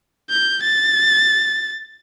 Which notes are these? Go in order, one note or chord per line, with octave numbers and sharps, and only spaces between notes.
G6
A6